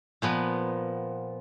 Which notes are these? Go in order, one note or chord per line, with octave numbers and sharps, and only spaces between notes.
A#2 F3 B3